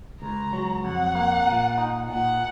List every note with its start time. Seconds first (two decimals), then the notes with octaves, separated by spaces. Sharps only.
0.22 C#2 A#5
0.53 F#3
0.85 F2 F#5
1.15 A#3
1.47 A#2
1.78 D#4
2.09 A#2 F#5